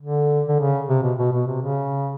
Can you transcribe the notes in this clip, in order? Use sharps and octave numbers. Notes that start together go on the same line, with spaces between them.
D3
D3
C#3
C3
B2
B2
B2
C3
C#3